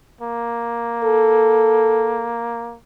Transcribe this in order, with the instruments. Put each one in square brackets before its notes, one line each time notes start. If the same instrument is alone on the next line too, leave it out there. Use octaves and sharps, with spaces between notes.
[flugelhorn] A#3
[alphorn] A4